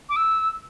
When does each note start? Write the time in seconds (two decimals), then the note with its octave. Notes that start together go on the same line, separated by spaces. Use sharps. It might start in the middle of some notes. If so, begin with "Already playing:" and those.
0.09 D6
0.16 E6